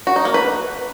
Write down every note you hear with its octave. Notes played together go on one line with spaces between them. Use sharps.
F#4
D#4
A#3
B4